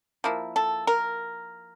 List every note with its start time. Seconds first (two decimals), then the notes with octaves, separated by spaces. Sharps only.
0.24 F3 A#3 E4
0.56 A4
0.87 A#4